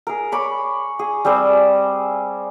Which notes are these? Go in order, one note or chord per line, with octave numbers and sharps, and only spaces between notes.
G#4 A#4
C#5 B5 D6
G#4
G3 C4 G#4 C5